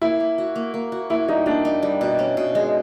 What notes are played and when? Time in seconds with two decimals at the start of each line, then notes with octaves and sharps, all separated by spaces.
0.01 A#3 E4
0.20 A#3
0.38 F#4
0.55 A#3
0.74 A#3
0.92 F#4
1.10 A#3 E4
1.28 G3 D#4
1.46 A#3 D4
1.65 D#4
1.83 G3
2.01 B2
2.19 C#4
2.37 B2
2.55 G#3